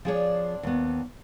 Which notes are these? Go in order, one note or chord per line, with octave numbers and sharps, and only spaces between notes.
F3 C4 D4 G#4 C#5
D#2 B3